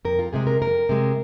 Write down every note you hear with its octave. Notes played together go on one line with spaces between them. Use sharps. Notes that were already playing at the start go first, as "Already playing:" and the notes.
F2 A#4
F4
C3 G#3 G#4
A#4
F2 A#4
C3 G#3